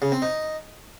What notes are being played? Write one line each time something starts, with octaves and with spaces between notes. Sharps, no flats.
C#3
C4
D#4